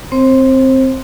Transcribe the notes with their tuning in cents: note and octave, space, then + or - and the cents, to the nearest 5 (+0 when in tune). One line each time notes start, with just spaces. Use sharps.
C4 +0 C5 +30